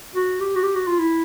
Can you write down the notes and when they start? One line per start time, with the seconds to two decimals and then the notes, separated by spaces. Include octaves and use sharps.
0.15 F#4
0.40 G4
0.55 F#4
0.63 G4
0.75 F#4
0.87 F4
0.99 E4